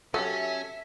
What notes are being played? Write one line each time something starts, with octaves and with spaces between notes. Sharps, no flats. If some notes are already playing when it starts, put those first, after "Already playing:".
F#3 C#4 G4 A4 E5